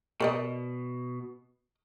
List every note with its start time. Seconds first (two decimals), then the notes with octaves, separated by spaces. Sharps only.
0.20 B2 A#4 D5 D#5